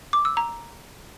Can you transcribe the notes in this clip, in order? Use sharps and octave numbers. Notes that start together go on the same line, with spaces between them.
D6
E6
A#5